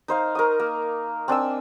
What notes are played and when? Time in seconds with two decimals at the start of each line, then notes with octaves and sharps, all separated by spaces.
0.08 D#4 C5 F5
0.35 A#4 C#6 D#6
0.60 A#3
1.28 C4 D4 G#5 E6